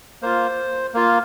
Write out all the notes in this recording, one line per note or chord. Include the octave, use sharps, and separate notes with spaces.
A#3 F4 C5
A#3 F4